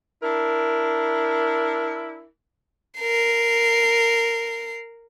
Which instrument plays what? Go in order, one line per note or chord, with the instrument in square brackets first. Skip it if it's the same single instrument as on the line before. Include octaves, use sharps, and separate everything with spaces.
[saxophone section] D4 E4 A#4
[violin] A#4 C7